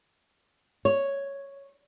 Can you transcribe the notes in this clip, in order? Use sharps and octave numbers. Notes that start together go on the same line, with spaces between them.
C#5